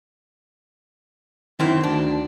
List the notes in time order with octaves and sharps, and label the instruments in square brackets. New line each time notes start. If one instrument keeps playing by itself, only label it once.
[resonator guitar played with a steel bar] F#2 C4 [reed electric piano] D#3 D#4 [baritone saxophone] E4
[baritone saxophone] D2 [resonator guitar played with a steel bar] D4